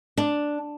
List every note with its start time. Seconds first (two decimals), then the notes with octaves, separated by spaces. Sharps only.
0.17 D4